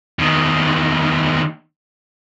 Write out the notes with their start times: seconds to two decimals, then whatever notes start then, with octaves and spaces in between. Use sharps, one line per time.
0.19 E2 D#3